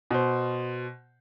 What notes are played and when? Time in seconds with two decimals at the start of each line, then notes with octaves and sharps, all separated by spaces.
0.11 B2 C5